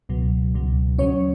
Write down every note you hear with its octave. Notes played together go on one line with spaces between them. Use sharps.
C#2 B2 F#3
C#2 B2 F#3
D2 D3 F#3 C#4 C#5